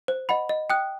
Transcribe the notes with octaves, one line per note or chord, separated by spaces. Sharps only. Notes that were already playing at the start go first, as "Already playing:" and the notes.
C5
D#5 F#5 B5
D#5
G5 D#6 F#6